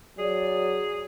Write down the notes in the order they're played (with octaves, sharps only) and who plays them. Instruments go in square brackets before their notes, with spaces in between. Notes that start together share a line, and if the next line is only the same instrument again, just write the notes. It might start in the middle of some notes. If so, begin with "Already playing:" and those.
[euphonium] F#3 [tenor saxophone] G#4 [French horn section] D5